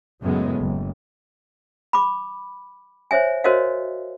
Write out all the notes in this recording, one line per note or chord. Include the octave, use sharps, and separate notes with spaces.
F#2 A2 C#3 F#3 G#3 B3
F#1
B5 D6
C5 C#5 E5 G#5
F#4 A#4 C5 C#5 D#5 F5